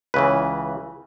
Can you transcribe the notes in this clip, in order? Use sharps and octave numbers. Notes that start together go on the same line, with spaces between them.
C#2 C#3 E3 B4